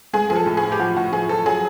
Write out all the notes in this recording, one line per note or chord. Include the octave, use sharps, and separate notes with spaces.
G#3 G#4
F3 G#4
A4
A2
G#4
A2
G4
F3 F#4
A2 F#4
F3 G#4
F3 A4
F#3 G#4